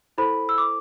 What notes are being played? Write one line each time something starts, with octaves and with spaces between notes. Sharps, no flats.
E4 A4 C5 B5
E6
D6